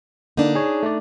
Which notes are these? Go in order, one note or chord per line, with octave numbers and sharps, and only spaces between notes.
D3 A#3 D4 D#4
G#4 C#5
A3 D5